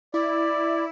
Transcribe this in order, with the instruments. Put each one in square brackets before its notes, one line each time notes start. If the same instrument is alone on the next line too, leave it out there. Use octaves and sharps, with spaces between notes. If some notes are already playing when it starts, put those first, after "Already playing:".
[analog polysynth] E4 [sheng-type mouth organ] D5